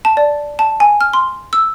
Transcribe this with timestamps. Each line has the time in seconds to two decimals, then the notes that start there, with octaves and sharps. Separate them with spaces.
0.05 A5
0.17 D5
0.59 A5
0.80 G#5
1.01 F6
1.13 C6
1.53 E6